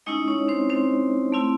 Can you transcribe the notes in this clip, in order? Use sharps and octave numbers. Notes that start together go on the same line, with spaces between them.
G#3 C#4 D#4 E4 D#5
C#4 C#5
C4 C5
C4 C5
A3 C4 E4